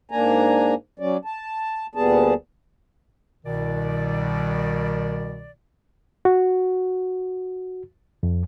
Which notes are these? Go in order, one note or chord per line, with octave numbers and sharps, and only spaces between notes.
G#2 A#3 D4 G#5 A#5
F#3 C#4 D5
A5
D2 A#2 G3 B3 G#4 A5
C2 B2 D#3 D5
F#4
F2